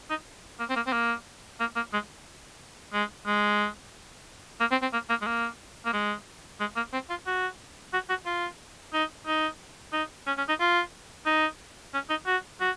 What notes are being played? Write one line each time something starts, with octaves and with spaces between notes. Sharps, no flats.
D#4
A#3
C4
A#3
C4
A#3
A#3
A#3
G#3
G#3
G#3
A#3
C4
C4
A#3
A#3
G#3
A#3
A#3
G#3
G#3
A#3
C4
F4
F#4
F#4
F#4
F4
D#4
D#4
D#4
C#4
C#4
D#4
F4
D#4
C#4
D#4
F#4
F#4